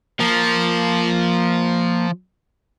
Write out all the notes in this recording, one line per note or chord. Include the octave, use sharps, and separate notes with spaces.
F3 A#3